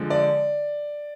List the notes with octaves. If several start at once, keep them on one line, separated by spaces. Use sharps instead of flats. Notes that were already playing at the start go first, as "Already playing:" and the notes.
Already playing: D3 F3 G#3
D5